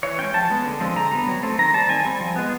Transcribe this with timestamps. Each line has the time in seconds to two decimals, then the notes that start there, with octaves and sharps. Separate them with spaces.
0.03 E3 C#5
0.19 G#3 C#4 G5
0.34 F3 A5
0.50 G#3 B3
0.66 D3
0.80 F3 G#3 C4
0.96 D3 A#5
1.11 G3 B3
1.27 F#3
1.43 A3 C4
1.58 D#3 A#5
1.74 G3 C4 A5
1.89 D#3 G#5
2.05 G3 C4
2.21 F3
2.36 G#3 B3